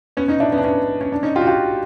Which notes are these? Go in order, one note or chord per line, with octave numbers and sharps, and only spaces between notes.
B3 C#4
C#4 D#4
D4 E4
B3 C#4
D4
B3 C#4
C#4
D4
C#4 D#4
F4 G4
F#4
F4 G4